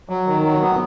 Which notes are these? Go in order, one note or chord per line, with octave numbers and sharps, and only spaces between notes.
F#3
D#3
F#3
B3